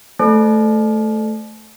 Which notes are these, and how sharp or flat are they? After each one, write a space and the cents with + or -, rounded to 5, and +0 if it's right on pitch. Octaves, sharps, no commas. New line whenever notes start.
A3 -10 C5 -25 A5 -40